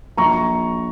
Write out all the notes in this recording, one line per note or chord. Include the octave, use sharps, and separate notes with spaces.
A#1 A#5 C#6